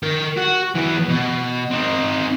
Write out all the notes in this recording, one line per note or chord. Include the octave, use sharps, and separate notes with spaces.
A#4 G5
F#4
E3 B3
B2
C4 D#4